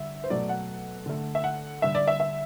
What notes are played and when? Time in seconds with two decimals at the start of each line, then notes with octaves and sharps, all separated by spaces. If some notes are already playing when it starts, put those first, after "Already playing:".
Already playing: D3 G3 E5
0.24 C5
0.30 B2 F#3 A3 D5
0.49 F#5
1.06 D3 A3
1.35 E5
1.44 F#5
1.82 D3 G3 E5
1.95 D5
2.07 E5
2.20 E5